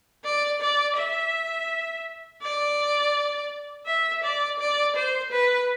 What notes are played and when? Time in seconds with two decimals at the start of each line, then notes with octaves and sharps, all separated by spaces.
0.25 D5
0.61 D5
0.97 E5
2.42 D5
3.87 E5
4.23 D5
4.60 D5
4.96 C5
5.32 B4